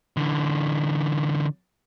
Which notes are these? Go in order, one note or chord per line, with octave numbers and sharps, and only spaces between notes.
D3 E3